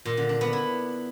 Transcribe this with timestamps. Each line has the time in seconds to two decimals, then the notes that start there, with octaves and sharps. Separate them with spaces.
0.05 A#2
0.17 D3
0.29 D4
0.41 B3
0.53 E4